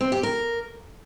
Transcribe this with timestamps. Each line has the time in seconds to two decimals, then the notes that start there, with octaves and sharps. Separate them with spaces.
0.01 C4
0.12 G4
0.23 A#4